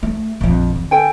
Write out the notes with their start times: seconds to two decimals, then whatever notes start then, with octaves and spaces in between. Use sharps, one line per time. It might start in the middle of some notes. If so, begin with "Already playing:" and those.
0.03 A3
0.41 A#1 F2
0.75 D3
0.91 A4 G5 G#5